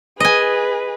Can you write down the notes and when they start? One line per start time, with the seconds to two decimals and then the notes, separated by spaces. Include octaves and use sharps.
0.20 G#4 B4 D#5 G#5